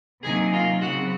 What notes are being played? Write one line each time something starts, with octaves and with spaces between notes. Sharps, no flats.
C3 D#3 F#3 A#3 G#4 G#5
F4 F5
C#3 F#3 C4 F#4 F#5